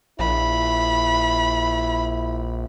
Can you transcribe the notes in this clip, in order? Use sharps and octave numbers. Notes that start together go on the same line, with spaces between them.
A#1 E4 B5